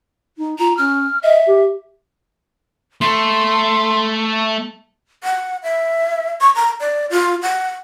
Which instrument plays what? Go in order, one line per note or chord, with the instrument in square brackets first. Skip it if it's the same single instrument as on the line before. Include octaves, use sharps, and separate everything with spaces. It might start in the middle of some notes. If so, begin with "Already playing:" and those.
[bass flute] D#4
[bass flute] F4 [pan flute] A#5
[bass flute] C#4 [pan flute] F6
[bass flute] D#5 [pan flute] E5
[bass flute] G4
[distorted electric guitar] A3 [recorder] C6
[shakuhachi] F#5
E5
C#6
A#5
D5
F4
F#5